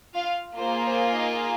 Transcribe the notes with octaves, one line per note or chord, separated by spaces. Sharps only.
F4 F5
A#3 F4 G#4 C5
C5
D#4 D#5